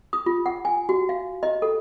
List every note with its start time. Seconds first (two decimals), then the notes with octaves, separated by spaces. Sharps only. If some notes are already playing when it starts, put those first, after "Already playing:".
0.13 D#6
0.26 F4
0.46 F#5
0.65 G#5
0.89 F#4
1.09 F5
1.43 D#5
1.62 A4